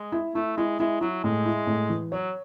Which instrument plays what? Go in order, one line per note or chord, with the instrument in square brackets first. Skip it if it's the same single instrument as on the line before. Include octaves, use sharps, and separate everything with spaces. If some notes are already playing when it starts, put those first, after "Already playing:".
Already playing: [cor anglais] G#3
[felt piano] E4
[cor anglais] A3 [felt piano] E4
[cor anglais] G#3 [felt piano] E4
[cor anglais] G#3 [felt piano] E4
[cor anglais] F#3 [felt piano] E4
[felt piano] A2 [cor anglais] G#3
[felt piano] E4
A2
E3
[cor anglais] F#3 [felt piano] C#5